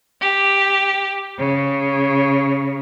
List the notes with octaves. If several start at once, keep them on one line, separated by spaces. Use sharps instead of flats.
G4
C#3